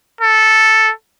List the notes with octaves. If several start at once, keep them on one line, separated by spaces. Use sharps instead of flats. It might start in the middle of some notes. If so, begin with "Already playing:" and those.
A4